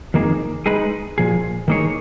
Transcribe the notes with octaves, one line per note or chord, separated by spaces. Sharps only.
F2 D#3 A#3 D#4 G#4
G#3 D#4 G#4 B4
A#2 F3 G#4
D#3 A#3 D#4 G#4 C#5